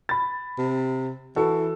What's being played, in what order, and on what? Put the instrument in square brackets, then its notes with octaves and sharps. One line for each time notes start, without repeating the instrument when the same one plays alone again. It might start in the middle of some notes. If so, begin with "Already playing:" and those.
[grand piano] B5 A6
[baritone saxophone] C3
[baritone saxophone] E3 [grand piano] F#4 A4